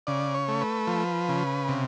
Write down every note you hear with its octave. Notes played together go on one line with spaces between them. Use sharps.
C#3 D5
C#5
A3
B4
F3
C#3
C3